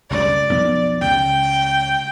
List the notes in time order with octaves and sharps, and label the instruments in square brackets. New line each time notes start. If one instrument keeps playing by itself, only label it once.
[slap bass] F#1 C#2 G2 [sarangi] D5
[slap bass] B1 F2 B3
[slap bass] C#2 [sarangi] G5